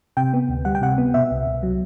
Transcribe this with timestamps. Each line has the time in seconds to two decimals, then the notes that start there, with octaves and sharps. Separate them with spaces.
0.17 C3 G5
0.33 B3
0.49 D2
0.65 G3 F#5
0.75 G5
0.81 C3 F#5
0.98 B3
1.14 B2 E5
1.31 C2
1.47 C2
1.63 F#3